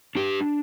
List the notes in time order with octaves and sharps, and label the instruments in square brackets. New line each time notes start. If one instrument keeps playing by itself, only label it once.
[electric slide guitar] D4 G4